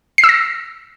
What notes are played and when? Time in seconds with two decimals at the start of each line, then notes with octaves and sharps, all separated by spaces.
0.18 C7
0.24 E6
0.29 A#6